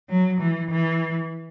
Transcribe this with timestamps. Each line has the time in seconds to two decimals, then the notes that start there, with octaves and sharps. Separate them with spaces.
0.09 F#3
0.41 E3
0.70 E3